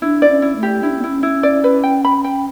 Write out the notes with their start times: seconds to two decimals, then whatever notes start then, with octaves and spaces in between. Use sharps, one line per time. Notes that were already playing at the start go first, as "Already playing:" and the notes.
0.02 D4 E4
0.22 D5
0.29 C#4
0.42 E4
0.56 A3
0.63 G4
0.83 D4 E4
0.91 C#4
0.99 B3
1.04 C#4 E4
1.23 E4
1.43 D5
1.64 B4
1.83 G5
2.05 B5
2.24 G5